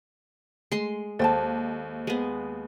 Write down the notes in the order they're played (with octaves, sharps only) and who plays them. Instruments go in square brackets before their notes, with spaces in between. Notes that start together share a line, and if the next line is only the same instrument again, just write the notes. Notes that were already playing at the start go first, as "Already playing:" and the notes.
[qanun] G#3 C6 [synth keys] A3
[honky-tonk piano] D#2 [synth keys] A4 C5 D#5 [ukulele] D5 G5 A5
[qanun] G#3 B3